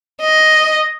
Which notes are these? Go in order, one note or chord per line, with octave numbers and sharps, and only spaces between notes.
D#5